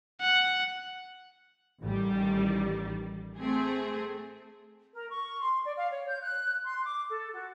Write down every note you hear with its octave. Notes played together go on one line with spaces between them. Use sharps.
F#5
A1 D#3 G3
A3 C4 G#4
A#4
C#6
C6
D5
F5
C#5
G6
F#6
C6
D6
A4
F#4